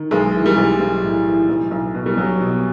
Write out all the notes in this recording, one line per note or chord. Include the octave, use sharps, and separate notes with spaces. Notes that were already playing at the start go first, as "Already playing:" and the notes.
Already playing: D#3
B1 G#3
E3
G3
B1
B1
A2
E3
B1
B1
B2
G3
B1 F#3
B2